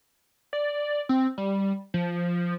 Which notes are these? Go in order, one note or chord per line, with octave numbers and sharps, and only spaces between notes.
D5
C4
G3
F3